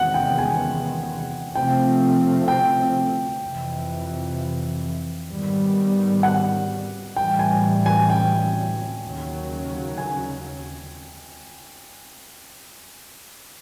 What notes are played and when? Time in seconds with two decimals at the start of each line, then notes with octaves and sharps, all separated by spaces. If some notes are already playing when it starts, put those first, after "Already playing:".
Already playing: E2 C3 D#3 G#3 B3 F#5
0.14 G5
0.38 G#5
1.55 C3 F3 A3 C4 G5
2.48 G5
3.42 F2 C3 E3
5.29 G#2 D#3 G3 B3
6.23 F#5
7.16 A2 E3 G3 G5
7.39 G#5
7.86 G#5
8.10 G5
9.03 D#2 C#3 F#3
9.98 G#5